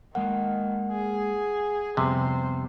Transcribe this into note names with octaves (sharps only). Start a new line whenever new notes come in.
D#3 G#3 A#3 A#4 F#5
G#4
F2 C3 G3 B3 C5